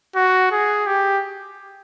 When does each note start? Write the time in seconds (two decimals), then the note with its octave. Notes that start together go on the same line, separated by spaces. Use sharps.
0.16 F#4
0.52 G#4
0.87 G4